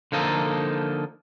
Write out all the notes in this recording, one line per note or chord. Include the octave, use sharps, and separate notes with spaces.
D3 F3 A#3 D#4 A4